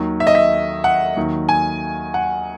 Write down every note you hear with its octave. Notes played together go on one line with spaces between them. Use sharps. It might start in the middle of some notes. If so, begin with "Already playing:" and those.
Already playing: D#2 D#3 F#3
E5
D#5
E5
F#5
D#2 D#3 F#3
G#5
F#5